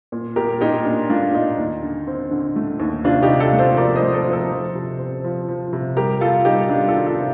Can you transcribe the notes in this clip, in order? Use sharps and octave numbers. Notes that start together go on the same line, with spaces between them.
A#2
A#2 G4 A#4
A#2 D#4 G4
D4
A3 D4 F4
A#2 D#4
D#2
D3
C4
D3
A3
D#2
C3 D4 F4
D#4 G4
C3
F4 A4
A3
A4 C5
F3 A#4 D5
C5 D#5
A3
A4 C5
F3
A4 C5
F3
C3
C4
F3
F3
C3
G3 G4 A#4
G3 F4 A4
G3 D#4 G4
G3 D4 F4
F4 A4
D#3
F4 A4
C3